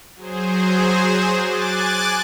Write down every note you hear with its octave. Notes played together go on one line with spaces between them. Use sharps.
F#3 G#4 C5
G#5 D6 F#6 A6